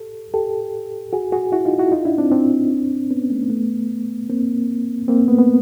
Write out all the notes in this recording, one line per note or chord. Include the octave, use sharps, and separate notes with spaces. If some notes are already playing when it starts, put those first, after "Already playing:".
Already playing: G4 A4
G4 A4
F#4 G#4
F#4 G#4
E4 F#4
D#4 F4
E4 F#4
D#4 F4
D4 E4
C4 D4
C4 D4
B3 C#4
A3 B3
A3 B3
A#3 C4
A#3 C4
A3 B3
B3